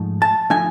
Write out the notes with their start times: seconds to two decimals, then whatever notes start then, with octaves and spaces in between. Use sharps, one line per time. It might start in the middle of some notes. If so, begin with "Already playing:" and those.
Already playing: G#2 F3 A3 D#4
0.22 A5
0.50 F3 A3 D#4 G#5